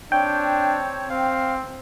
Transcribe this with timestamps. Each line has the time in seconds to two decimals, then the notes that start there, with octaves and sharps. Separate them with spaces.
0.12 C4 D4 C#5 G5
1.10 C4 F5